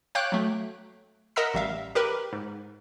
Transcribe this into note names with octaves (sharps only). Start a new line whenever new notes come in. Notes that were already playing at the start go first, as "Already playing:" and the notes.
C#5 F5 G5 D6 F#6 G6
F#3 A3
A#4 D#5 F#5 A#5 E6 B6
A1 G3 E5 F5
G4 A#4 B4 B5
G#2